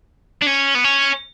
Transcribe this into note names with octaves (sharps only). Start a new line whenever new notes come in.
D4
C#4
B3
C#4